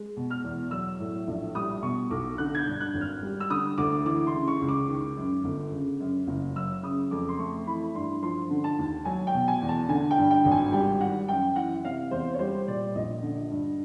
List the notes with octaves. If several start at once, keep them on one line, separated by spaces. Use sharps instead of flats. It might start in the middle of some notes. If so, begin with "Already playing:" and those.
Already playing: G#3
B2
F6
E2
F#3 E6
A2
A#1
G3 D#6
B2 C#6
B1 D6
D3 F#6
G#6
G6
G2
F#6
G#1
F6
G3
E6
D3 D#6
D2 D6
E3 D6
C6
C#3
C#6
C#2
D6
D#3
F#2
G1
C#3
F#2
F#1
F#3 E6
C#3 D#6
F2 D6
C6
A3 C#6
E3 B5
G2 C6
F3 C6
D3
A5
D#2
F#3 G#5
G5
B2
G#5
E2
A5
D3 G#5
G5
G2
G5
G#1
G#5
G3 G5
D#3 F#5
F#2 G5
E3 F#5
C3 F5
E2 C5
C#5
G3 C5
A#2 D5
A#1 D#5
D3
G2